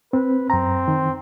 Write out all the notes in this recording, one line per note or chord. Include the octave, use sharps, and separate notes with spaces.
C4 B4
F#2 C4 A#5
D#3